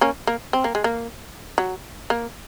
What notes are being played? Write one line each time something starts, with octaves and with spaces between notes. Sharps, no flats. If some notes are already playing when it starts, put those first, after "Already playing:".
A#3 C#4
A#3
C4
A#3
G#3
A#3
F#3
A#3